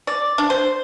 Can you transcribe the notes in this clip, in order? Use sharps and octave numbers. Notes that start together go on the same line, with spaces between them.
D5
D4
C5